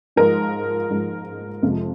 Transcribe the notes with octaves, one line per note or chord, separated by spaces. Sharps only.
G#2 F3 G#3 A#4
G#2 F3 G#3
F2 C3 F3 G#3